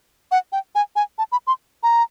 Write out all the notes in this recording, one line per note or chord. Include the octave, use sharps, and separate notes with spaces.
F#5
G5
G#5
G#5
A5
B5
C6
A#5